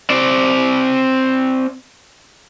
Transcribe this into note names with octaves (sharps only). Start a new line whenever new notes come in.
C4 D5